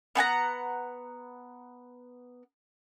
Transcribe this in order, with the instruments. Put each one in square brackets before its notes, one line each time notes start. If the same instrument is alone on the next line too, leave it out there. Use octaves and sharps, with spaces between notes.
[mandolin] B3 F#5 G#5 A#5